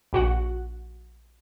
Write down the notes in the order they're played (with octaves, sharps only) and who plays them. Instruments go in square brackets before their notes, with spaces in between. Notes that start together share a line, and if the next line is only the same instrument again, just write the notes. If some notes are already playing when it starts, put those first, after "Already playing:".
[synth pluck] A#1 F#4 F#5